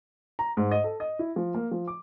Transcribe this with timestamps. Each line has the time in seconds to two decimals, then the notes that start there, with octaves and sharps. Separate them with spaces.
0.39 A#5
0.57 G#2
0.71 D#5
0.84 A4
1.00 D#5
1.19 E4
1.36 F3
1.54 A#3
1.71 F3
1.88 D6